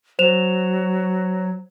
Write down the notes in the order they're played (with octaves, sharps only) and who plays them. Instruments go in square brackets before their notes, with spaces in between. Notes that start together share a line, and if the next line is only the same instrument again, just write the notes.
[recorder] F#3 [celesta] C5 E7 F7